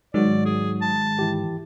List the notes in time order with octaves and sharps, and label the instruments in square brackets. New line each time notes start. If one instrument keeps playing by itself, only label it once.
[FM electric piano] G#2 D#3 G#3 [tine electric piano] F#3 F#4 [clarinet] D5
[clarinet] G#4
A5
[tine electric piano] E3 E4 G4